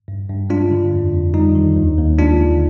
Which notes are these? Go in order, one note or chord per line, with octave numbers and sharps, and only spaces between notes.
G2
G2
G#3 D4 F4
D3
F2
F2
G3 D#4
D#3
D#2
D#2
G#3 D4 F4
D3